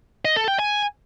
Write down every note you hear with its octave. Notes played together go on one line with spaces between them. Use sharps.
D#5
A4
G5
G#5